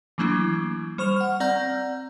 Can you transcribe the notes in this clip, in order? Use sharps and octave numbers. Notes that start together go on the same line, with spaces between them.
E3 F#3 A3 A#3 D4 E4
G3 C5 C#6 F6 F7
F#5 F6
C4 D5 F#5 A#5 G6